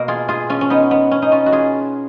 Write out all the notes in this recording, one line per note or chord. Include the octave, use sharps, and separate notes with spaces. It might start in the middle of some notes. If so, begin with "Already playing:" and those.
Already playing: B2 A#3 A#4
F4 G#4
F4 G#4
C#4 F4
C#4
B3 D#4
B3
C#4
D#4
C#4 F4
F#4
F4 G#4